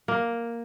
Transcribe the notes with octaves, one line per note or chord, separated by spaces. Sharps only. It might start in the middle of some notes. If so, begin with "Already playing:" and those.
A#3